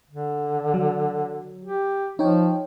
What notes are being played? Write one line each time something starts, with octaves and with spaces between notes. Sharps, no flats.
D3
F#3
G4
F3 D#4 C#5 G5